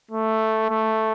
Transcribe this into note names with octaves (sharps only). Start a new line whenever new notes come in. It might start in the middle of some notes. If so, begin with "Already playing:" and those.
A3
A3